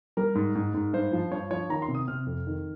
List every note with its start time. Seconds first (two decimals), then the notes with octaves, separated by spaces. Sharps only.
0.17 G3 A#4
0.35 G#2
0.55 G#2
0.74 G#2
0.93 G2 C5
1.12 F3
1.32 G2 C#5
1.51 F3 C#5
1.69 D#3 A#5
1.82 C6
1.88 C3
1.95 D#6
2.08 C3 F6
2.27 F2
2.47 D#3